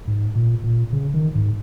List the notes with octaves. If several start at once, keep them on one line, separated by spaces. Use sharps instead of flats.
G#2
A#2
A#2
C#3
D#3
G#2